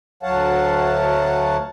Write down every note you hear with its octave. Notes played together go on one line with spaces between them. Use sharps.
D2 F#3 C#5 F5 F#5 A5